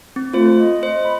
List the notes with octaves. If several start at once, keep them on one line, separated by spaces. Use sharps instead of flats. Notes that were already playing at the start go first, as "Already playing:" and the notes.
C4
A3 F4 C5
D#5
C5
B5